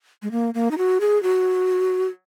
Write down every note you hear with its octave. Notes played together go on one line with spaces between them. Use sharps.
G#3
A#3
A#3
D#4
F#4
G#4
F#4